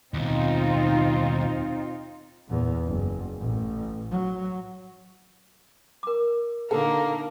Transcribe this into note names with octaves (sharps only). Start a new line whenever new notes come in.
D#2 B2 C4 D#4 F4
E2 A#2
F#1
A1
F#3
A#4 D6
A#2 D3 A#3 D#4 A4